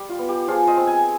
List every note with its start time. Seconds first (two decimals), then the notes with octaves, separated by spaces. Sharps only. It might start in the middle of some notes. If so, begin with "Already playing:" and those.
Already playing: G3 G4
0.09 F4
0.19 B3
0.29 G4
0.48 F3 F4 G#4
0.67 C5 D#5
0.77 C4
0.87 G#5